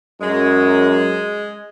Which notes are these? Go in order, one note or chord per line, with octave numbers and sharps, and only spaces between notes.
F#2 G#3